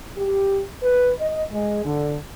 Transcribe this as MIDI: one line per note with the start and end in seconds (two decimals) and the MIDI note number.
0.17 0.61 67
0.83 1.13 71
1.20 1.43 75
1.52 1.84 56
1.85 2.16 50